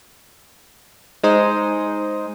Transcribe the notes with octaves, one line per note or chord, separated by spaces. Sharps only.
G#3 D#4 C5 D#6